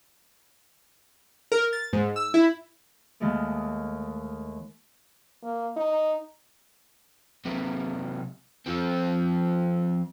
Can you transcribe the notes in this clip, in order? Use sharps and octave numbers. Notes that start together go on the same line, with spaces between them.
A#4
A6
G#2
E6
E4
D#2 D#3 G#3 A3
A#3
D#4
C3 F#3
F3 C4